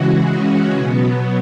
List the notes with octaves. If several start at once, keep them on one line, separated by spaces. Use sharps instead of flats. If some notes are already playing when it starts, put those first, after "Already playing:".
Already playing: C#3 E3 G#3 F#4
C#4
B2 F#3 B3